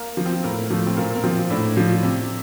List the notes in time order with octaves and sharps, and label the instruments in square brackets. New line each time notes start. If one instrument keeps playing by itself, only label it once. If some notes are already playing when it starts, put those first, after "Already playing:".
Already playing: [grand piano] A#3
F3
C4
A2 A#3
F3 A3
C4
A#2 A#3
A#3
F3 C4
A2 D4
F3
C3